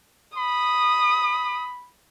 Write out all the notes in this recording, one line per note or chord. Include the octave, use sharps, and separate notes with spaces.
B5 D#6